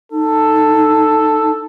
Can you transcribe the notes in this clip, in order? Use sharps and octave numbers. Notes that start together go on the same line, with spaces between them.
D#4 A4